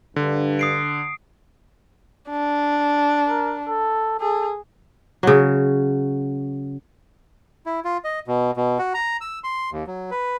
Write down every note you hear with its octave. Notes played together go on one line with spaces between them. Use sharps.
G2 D3
D#6 C7 D7
D4
A#4
A4
G#4 A4
C#3 F#3
E4
F4
D#5
B2
B2
F#4
A#5
E6
C6
D#2
F#3
B4